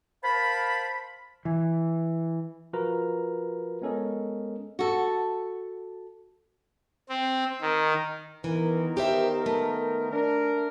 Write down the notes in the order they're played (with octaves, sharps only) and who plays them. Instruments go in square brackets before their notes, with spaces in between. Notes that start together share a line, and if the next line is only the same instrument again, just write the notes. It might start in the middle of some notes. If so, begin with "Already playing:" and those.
[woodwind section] A#4 C5 F5 A5 B5
[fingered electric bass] E3
[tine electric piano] F3 F4 F#4 A#4 B4 A#5
G#3 B3 C#4 A4 A#4 D#5
[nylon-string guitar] F#4 A4
[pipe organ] C4
D#3
[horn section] D#3 B3 A#4 [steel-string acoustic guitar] E3
[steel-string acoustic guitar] G4 C5 E5
A3
[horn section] D4 A#4